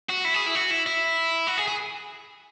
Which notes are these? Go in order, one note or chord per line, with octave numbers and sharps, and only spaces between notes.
F#4
E4
G#4
E4
F#4
E4
E4
F#4
G#4
G#4